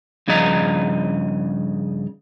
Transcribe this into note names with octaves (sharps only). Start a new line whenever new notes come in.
G2 C#3 F3 D#5 A#5